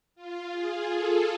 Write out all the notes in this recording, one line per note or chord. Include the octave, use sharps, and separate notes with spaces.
F4
G#4
A4